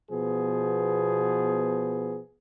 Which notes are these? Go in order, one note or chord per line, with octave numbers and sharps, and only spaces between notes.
B2 F3 B3 G#4